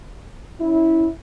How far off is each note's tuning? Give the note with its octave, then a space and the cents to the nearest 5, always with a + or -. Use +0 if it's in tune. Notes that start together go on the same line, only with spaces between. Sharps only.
C#4 +10 E4 -15